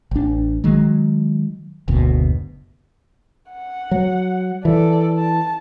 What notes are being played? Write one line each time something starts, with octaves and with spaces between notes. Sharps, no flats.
A1 D4
D#3 F#3 G#3
F#1 D2 B2
F#5
F#3
E3 A4 D5
A5